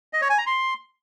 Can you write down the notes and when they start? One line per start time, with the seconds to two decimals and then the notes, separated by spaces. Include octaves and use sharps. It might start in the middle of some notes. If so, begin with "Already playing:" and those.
0.13 D#5
0.21 C#5
0.30 G#5
0.38 A#5
0.46 C6